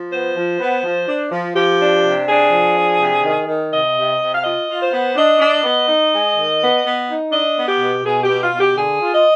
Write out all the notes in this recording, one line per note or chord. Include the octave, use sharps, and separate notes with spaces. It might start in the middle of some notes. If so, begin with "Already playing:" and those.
Already playing: F3
B3 C5
F3
B3
F3
D4
F3
F3 G4
D4
C3
D4 G#4
F3
D4
C3
D#3
D#3
C3 D#5
C3
C3
F5
F4 D#5
F4
C5
B3
D4 D#5
D4
D#5
B3
D#4
G#3
D#3
B3
B3
D#4
D4 D#5
B3
G4
B2
B2 G#4
G4
B2
F4
B2
G4
D3 G#4
F4
D#5